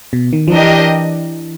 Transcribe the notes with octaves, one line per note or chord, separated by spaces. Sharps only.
B2
D#3
F3
E3 D4 G4 A#4 D#5